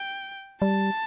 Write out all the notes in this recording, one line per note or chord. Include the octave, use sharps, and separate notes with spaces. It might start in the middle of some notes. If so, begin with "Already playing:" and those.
Already playing: G5
G3 A5